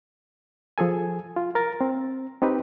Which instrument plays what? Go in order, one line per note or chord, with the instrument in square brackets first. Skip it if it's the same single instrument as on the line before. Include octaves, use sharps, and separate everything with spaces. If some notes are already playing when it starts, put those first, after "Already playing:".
[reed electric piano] F3 G#4 A4 G#5
F4
A#4 A6
C4
C4 D#4 G4 B4